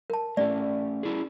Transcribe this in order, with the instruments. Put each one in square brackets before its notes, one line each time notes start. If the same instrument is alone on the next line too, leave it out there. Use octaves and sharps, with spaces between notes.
[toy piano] A#4 A5
[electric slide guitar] A3 C#4 G4 [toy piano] D5
[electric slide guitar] C#4 E4 G#4